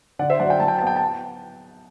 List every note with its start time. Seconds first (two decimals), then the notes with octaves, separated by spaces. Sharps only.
0.19 D3 D5 F#5
0.30 C5 E5
0.39 F#3 D5 F#5
0.50 G5
0.60 F#3 A5
0.68 G5
0.78 B3 A5
0.87 G5
0.96 A5